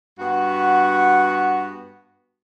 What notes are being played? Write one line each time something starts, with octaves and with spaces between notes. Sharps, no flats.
G2 B3 F#4